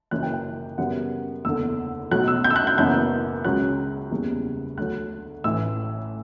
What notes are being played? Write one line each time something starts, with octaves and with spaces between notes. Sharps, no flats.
F#1 F#2 E3 F#6
G5
G5
F#2 C#3 G3 B3 F#5
F#1 E2 D3 E6
B1 B2 F#3 A3 F#6
E6
G6
E6
F#6
G6
F#1 F#2 E3 B3 G6
C#2 C#3 F#3 F#6
F#1 E2 C#3 G3
D2 D3 F#3 F#6
A1 A2 E3 E6